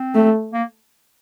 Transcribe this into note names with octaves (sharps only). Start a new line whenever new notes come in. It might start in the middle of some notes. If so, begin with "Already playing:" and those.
Already playing: C4
A3
A#3